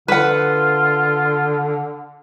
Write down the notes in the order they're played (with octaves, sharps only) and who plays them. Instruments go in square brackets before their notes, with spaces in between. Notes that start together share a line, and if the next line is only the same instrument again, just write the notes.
[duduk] D3 [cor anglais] F4 [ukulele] B4 F#5